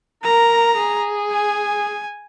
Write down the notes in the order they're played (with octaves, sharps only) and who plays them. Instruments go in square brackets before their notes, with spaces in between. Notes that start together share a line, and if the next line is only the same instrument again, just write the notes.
[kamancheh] A#4 [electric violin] A#5
[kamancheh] G#4
[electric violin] G#5